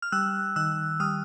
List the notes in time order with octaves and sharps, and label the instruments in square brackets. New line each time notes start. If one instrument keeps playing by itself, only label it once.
[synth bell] F6
G3 E6 F#6
D#3 E6 F#6
G3 D#6 F6